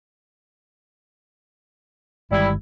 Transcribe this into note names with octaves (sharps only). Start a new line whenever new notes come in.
G1 D#3 G3 G#3 E4